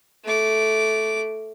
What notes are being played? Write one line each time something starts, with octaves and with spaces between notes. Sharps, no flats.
A3 D6